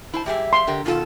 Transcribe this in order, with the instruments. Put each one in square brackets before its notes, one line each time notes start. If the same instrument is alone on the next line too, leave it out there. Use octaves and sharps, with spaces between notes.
[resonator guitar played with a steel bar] E4 C5 A5
[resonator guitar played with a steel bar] G3 G4 G#4 [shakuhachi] E5
[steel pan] C6
[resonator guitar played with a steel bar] D3 G4 A#4
[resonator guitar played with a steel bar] B2 D#3 A4 [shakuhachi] F4